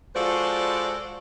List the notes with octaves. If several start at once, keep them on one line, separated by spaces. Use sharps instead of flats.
F3 G#3 F#4 A4 C5 D5